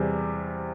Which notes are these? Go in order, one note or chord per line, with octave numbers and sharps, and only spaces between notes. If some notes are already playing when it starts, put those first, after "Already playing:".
Already playing: E2 C3 G3